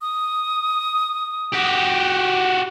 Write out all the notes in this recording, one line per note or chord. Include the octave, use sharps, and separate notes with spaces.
D#6
F#4 G4